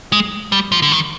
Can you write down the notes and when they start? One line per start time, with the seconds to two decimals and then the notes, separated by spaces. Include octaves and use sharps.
0.13 G#3
0.52 G3
0.72 F3
0.82 D3
0.92 D#3